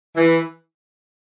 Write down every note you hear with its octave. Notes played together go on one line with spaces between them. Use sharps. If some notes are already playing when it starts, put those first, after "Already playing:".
E3